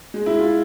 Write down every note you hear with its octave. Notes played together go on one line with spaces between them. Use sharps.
G#3
E4
F4